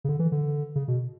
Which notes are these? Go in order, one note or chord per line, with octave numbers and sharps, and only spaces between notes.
C#3
D3
E3
D3
C#3
B2